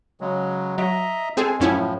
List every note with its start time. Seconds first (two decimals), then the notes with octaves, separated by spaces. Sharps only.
0.21 C#3 F#3 G#3
0.78 F#3 D#5 E5 A#5
1.37 G#3 C4 G#4 A4 G#5
1.60 F#2 A2 F3 C#4 E4